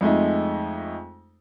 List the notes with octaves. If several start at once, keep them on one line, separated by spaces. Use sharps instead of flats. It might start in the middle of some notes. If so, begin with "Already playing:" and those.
F2 G#3 A3 D#4